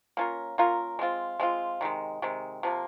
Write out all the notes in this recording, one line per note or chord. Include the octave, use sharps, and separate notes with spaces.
A#3 C#4 F4 A#4
A#3 C#4 F4 A#4
G#3 C4 F4
G#3 C4 F4
C3 D#3 G#3
C3 D#3 G#3
C3 F3 A#3